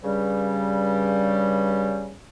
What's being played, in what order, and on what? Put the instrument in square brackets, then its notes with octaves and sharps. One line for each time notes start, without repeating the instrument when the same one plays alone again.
[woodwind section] G2 C#3 G3